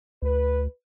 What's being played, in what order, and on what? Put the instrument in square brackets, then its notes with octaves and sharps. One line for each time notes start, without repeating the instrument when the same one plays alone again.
[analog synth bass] D2 [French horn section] B4